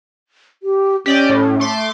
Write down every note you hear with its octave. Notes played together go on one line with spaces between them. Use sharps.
G4
C#4 G4 D5 D#5
A2
A3 C6 D6